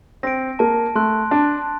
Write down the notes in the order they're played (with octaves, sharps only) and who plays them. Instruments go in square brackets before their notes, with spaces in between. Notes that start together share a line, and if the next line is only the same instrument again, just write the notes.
[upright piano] C4 [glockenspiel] A#6 D7
[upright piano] A#3 [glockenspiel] A5
[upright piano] A3 [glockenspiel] C6 F#6
[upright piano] D4 [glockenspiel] A5